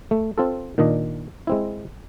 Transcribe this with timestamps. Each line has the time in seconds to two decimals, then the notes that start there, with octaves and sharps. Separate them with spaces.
0.11 A3
0.38 C4 F4 A4
0.78 A#2 D#3 D4 D#5
1.47 G#3 C4 E4